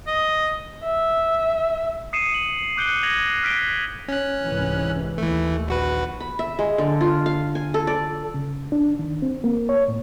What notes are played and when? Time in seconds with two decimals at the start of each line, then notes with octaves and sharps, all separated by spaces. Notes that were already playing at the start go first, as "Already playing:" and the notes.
0.07 D#5
0.85 E5
2.13 D#6 C7 C#7 D#7 E7
2.34 F#7
2.77 D6 F#6 G6 C#7 D7 G7
3.03 G#6 A#6 F7 F#7
3.43 F6 B6 D7 G7
4.08 C#4 F#6
4.46 C2 G#2 E3
5.18 D#2 E3 A3
5.68 A#1 F#4 B4
6.20 B5
6.39 E5
6.59 G#3
6.78 D3
7.01 F4
7.26 F5
7.55 G#5
7.74 A4
7.87 D5
8.34 C#3
8.72 D4
8.99 D#3
9.22 C4
9.44 A#3
9.69 C#5
9.88 A2